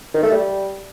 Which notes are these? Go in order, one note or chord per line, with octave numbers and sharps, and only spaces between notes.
D#3
A3
G3